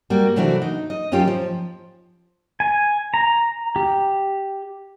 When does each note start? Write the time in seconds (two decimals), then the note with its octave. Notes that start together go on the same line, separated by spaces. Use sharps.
0.10 G3 A#3 F#4
0.36 C3 E3 A3 D4 E4 F#4
0.62 D#4
0.90 D#5
1.12 F#2 C#4 D#4 F4 G4
1.27 F3
2.60 G#5
3.14 A#5
3.76 G4